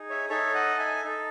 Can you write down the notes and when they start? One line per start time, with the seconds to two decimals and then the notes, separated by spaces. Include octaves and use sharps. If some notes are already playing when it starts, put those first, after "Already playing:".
Already playing: D#4 G#4
0.10 C#5 E5
0.29 D#4 A4 C#5 E5
0.55 D#5 F#5
0.79 E5 G#5
1.04 D#4 A4